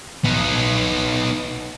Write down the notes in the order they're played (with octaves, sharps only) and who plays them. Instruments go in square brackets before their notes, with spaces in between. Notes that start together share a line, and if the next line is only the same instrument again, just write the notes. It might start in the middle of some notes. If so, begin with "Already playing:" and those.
[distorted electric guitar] B3 D#4